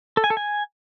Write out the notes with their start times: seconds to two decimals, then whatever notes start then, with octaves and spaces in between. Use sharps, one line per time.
0.17 A4
0.24 G#5
0.30 A4
0.37 G#5